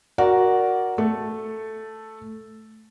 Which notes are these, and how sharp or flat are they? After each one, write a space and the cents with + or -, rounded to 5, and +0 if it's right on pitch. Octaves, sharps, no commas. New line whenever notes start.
F#4 +0 A#4 +0 D5 -15
A3 -5 A4 +0